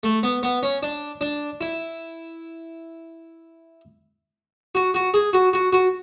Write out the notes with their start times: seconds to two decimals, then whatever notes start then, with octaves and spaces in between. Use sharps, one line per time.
0.03 A3
0.23 B3
0.43 B3
0.63 C#4
0.83 D4
1.21 D4
1.61 E4
4.75 F#4
4.94 F#4
5.14 G#4
5.33 F#4
5.53 F#4
5.73 F#4